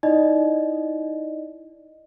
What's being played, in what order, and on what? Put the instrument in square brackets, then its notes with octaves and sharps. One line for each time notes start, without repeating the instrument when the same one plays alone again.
[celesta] D#4 E4 D5 D#5